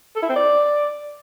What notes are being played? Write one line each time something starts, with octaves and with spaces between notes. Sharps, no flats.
A4
E4
C4
D5